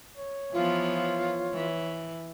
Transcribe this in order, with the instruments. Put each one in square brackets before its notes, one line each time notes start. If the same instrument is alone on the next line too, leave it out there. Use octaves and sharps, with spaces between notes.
[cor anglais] C#5
[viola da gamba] E3 F3 B3 [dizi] F4
[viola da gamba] E3